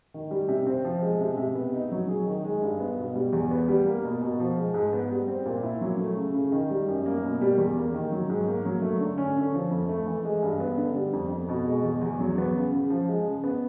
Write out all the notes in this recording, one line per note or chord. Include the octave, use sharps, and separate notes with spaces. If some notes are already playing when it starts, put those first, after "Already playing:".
D#3
G3
C3
C4
F3
G#3
C3
C3
B3
D#4
F#3
G#4
D#3
G#3
G2
B3
B2
G3
E2
B3
G3
A#3
B2
B2
F3
G#3
G#2
B3
G3
C4
A#2
E4
F#3
A3
C#3
C#3
D#3
G3
F#2
A#3
B2
G3
E2
A#3
D#3
F#3
G#2
A#3
F#3
A3
D3
C#4
D3
F3
F2
A3
E3
G#3
G2
B3
D3
G3
F2
F2
B2
G#3
E2
E2
F#3
B3
C#3
C#3
F3
G#3
C#3
B3